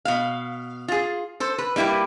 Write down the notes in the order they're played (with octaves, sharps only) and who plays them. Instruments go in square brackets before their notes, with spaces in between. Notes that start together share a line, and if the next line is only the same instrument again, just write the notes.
[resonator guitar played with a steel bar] B2 F5
F4 G#4
A4 C5
B4
G3 A#3 E4 G4 B4